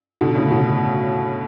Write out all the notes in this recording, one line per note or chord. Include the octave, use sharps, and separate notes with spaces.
B2 D3
A2 C#3
B2